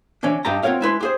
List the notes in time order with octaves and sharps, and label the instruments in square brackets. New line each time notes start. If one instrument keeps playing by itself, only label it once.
[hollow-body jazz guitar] E3 C#4 D4
G2 D#4 G4 A5 A#5
C4 F4 A#4 C#5 F5 F#5
G#3 E4 B4 C6
G4 G#4 C5